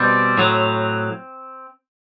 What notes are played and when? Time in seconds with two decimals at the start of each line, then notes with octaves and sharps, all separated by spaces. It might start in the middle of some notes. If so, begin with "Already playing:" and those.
Already playing: B2 G3 C4
0.38 A2 F#3